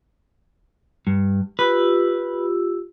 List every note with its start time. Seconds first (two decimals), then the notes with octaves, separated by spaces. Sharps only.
1.07 G2
1.59 F4 G4 B4 E6